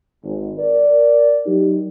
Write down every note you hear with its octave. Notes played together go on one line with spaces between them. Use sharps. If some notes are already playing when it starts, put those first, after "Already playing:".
G#1
A#4 D5
F#3 D#4 G4